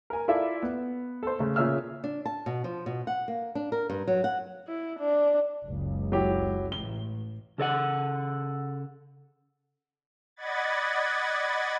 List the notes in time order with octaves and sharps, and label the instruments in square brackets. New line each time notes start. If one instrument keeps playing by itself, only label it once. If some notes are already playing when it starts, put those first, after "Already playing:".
[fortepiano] A#4 G#5
E4 F4 A4 D5 E5
B3
A4 C5
C#3 A3
A#2 C#3 C#4 E5 E6 F6
[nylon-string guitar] D4
A5
B2
F3
B2
F#5
A#3
D4
A#4
G2
F#3
F#5
[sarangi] E4
D4
[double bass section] F#1 C#2
[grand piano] F#3 E4 G4
[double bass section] A1 [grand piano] G7
[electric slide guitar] C#3 A4 D5 F#5
[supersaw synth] D5 D#5 F#5 B5 G#6 A6